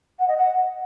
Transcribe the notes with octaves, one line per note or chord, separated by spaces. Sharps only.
F#5
D#5
F#5